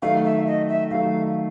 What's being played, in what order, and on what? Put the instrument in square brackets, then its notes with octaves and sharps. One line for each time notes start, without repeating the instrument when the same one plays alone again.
[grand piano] D#3 F#3 A3 [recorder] F5
[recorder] E5
D#5
E5
[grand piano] D#3 F#3 A3 [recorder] F5